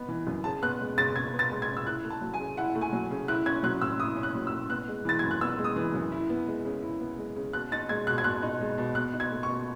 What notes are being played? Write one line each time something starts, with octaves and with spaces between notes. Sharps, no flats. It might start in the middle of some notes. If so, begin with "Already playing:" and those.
Already playing: B3 D#4 B5
E3
F#2
C#3 A5
B3 F#6
G#3
C#3 A6
C#3 G#6
B3
A6
G#3
G#6
C#3
E6
E4 F#6
A3
A5
F#3
G#5
C#3
E4 F#5
A3
G#5
F#3
C#3
E4 F#6
C#4 G#6
F#3 F#6
A2 E6
E4 D#6
C#4
F#6
F#3
E6
A2
B3 F#6
G#3
E3 A6
F#2 G#6
F#6
B3 E6
G#3
D#6
E3
F#2
E4
B3
G#3
C#3
E4
B3
G#3
C#3
B2 F#6
D#4 A6
G#3 G#6
B2 F#6
G#6
B2 F#6
D#4
G#3
B2
B2 F#6
D#4
G#6
A3
C#6
B2